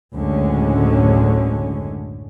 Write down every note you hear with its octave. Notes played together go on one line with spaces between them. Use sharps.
F#1 D2 A2 D3 G#3 C#4